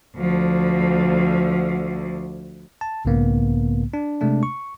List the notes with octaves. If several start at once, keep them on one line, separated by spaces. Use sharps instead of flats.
D2 F3
A5
B1 G#2 C#3 A#3 B3
D4
C3 G#3 A3 D4
C#6